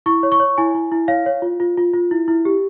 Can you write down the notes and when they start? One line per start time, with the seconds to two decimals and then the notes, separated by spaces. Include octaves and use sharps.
0.06 E4 C#6
0.23 C#5
0.32 C#6
0.40 C#5
0.58 E4 G#5
0.74 E4
0.92 E4
1.08 C#5 F5
1.26 C#5
1.42 F4
1.60 F4
1.77 F4
1.93 F4
2.11 E4
2.28 E4
2.45 G4